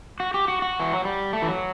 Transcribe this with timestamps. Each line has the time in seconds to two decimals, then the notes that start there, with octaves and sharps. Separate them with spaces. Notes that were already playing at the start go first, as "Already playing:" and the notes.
0.20 F#4
0.34 G4
0.48 F#4
0.62 F#4
0.80 E3
0.93 F#3
1.05 G3
1.33 A3
1.42 E3
1.48 F#3